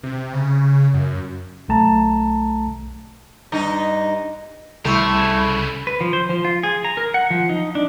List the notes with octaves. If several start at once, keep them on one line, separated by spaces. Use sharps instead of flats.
C3
C#3
F#2
B1 A3 A5 A#5
G2 D#4
C2 C3 A3 B5 C#6 E6
C#3 E4
B4
F3
C5
F3
F4
G#4
A#5
A#4
F#5
F3
D#4
D4